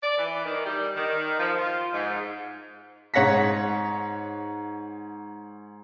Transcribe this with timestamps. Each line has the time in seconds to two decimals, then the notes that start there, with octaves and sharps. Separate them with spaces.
0.03 D5
0.17 E3
0.45 D#3
0.65 G3
0.96 D#3
1.39 F3
1.59 F4
1.94 G#2
3.14 G#2 C#5 F#5 A#6 B6